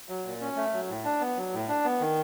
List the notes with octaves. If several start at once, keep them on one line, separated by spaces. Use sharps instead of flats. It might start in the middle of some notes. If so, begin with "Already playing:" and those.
F#3
A#2
C#4
A3
F#3
A2
D4
B3
F#3
A2
D4
B3
D#3